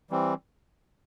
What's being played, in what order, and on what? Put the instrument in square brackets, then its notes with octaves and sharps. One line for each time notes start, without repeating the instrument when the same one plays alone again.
[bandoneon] E3 G3 C4